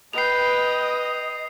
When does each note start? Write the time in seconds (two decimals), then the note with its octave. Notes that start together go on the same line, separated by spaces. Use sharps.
0.13 B4 D#5 G5 C7 F7